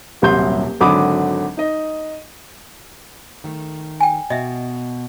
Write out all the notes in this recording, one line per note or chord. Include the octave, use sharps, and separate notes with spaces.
D#1 C2 F#3 E5 C6 G6
G#1 D3 F#3 B5 D6 D#6
D#4 D#5
D#3 A3
G5 G#5
B2 D#5 E5